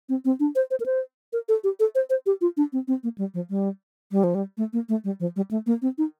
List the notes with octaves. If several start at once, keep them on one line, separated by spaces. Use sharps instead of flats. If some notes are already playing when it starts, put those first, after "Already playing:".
C4
C4
D4
C5
C5
A#4
C5
A#4
A4
G4
A4
C5
C5
G4
F4
D4
C4
C4
A#3
G3
F3
G3
G3
F3
G3
A3
A#3
A3
G3
F3
G3
A3
A#3
C4
D#4